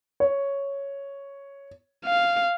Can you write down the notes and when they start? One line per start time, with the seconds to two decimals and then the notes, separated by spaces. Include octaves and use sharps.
0.20 C#5
2.06 F5